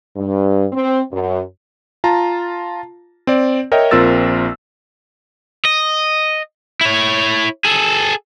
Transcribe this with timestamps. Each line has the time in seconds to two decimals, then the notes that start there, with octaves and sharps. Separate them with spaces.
0.16 G2
0.73 C4
1.12 F#2
2.04 F4 A5 A#5
3.27 C4 D5
3.72 A#4 C#5 D#5 E5 G5
3.91 A#1 C4 F4 A#4 E6 A6
5.65 D#5
6.81 E4 C#5
7.65 G#4 A4